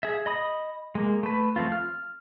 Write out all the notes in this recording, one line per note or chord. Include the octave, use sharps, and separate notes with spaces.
G#4 E5
D#5 B5 D#6
G#3 A#3
A3 B4
F3 A3 C4 F4
F6